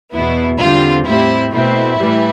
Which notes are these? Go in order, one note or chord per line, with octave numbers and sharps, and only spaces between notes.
E2 B2 B3 E4
E2 D3 G3 C4 F4
A2 G3 C4 E4
B2 A3 C4 E4
A2 E3 G3